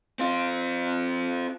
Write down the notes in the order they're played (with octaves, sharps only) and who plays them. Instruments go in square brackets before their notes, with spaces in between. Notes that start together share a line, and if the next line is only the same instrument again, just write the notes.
[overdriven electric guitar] C4 F4